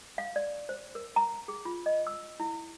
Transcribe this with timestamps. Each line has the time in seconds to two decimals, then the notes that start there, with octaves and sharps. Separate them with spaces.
0.18 F5
0.36 D5
0.69 C5
0.95 A#4
1.16 A#5
1.48 G#4
1.65 F4
1.86 D#5
2.07 E6
2.40 E4